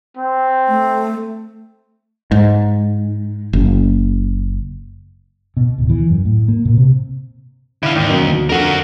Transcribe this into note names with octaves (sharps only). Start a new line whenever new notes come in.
C4
A3
G#2
F#1
B2
D1
E3
F#2
A2
A#3
A#2
C3
D3 E4 F5
D#2 G#2 D5 G5
F#2 B2
D2
F2 D3 F#4 A#4